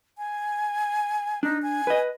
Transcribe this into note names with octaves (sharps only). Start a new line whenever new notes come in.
G#5
D4 D#4
G#5
B4 D#5